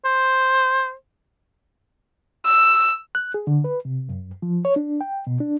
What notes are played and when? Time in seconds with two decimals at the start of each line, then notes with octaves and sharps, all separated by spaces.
0.05 C5
2.46 E6
3.15 F#6
3.34 G#4
3.47 D3
3.64 B4
3.85 C3
4.09 F#2
4.42 F3
4.65 C#5
4.76 D4
5.01 G5
5.27 B2
5.40 D4